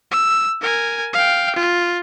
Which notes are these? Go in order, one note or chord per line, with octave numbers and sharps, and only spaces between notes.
E6
A#4 G#5
F5 G5
F4